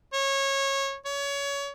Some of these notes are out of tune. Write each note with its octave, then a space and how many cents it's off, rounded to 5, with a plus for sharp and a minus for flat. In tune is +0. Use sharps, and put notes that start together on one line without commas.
C#5 -20
C#5 +25